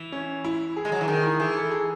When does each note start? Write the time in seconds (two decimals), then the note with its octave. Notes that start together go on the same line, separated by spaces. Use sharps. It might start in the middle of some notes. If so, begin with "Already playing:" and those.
Already playing: E3
0.12 C#4
0.44 E4
0.76 G#4
0.85 G#3
0.92 F#3
1.01 E3
1.08 D#3 G#4
1.24 E4
1.40 E3 G#4
1.56 A4
1.71 G#4